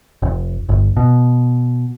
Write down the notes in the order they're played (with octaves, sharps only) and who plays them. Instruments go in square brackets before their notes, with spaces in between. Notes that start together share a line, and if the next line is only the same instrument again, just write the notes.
[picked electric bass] F1
G1
B2